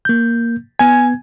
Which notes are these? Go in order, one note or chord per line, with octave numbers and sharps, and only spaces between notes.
A#3 G6
B3 G#5 G#6